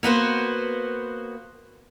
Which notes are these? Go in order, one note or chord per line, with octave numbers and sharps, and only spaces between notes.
A#3 B3 F#4 C5